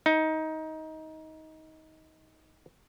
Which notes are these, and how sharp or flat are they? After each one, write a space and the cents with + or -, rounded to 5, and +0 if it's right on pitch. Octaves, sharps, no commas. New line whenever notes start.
D#4 +20